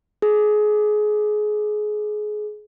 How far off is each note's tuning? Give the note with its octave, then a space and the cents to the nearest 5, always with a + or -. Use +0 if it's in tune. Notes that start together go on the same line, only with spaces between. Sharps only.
G#4 +25